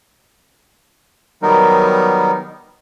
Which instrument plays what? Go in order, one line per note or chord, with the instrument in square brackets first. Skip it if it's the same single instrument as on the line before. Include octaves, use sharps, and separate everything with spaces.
[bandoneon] D#3 F#3 G3 B3 D#4 A#4